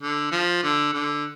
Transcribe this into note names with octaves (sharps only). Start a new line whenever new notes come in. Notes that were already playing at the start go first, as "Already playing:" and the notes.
D3
F3
D3
D3